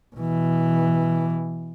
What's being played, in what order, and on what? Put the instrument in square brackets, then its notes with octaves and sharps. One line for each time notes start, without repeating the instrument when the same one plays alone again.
[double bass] B2 E3